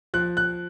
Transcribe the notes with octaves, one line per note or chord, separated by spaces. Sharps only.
F3 F#6
F#6